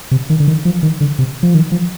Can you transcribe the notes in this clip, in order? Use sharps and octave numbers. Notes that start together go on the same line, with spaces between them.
C3
D#3
D3
D#3
F3
D#3
D3
C3
F3
D#3
F3